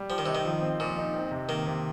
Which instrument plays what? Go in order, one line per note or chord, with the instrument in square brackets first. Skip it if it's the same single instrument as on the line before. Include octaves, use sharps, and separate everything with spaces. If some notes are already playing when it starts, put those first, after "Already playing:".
Already playing: [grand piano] G3
[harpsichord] F3 [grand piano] G4
[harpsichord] D#3
[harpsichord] C3 [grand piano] D#4
[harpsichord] D#3
[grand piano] F3
C4
[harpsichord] A#2 [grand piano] F3
[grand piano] D#4
C4
C3
[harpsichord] D#3 [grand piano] A#3
[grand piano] C3